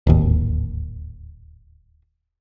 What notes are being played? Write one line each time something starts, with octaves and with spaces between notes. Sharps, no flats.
D1 G#1 D#2